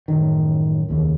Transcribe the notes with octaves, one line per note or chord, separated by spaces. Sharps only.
A1 F#2 D#3
F1 D#2 C#3